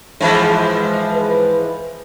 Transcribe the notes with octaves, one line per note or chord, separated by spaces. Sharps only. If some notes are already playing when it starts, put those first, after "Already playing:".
G#2 E3 F3
B4